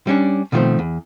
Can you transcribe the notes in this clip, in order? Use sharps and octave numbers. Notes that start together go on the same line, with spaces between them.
G3 C#4 D4
B2 D#3 F3 G3 A3 C4
E2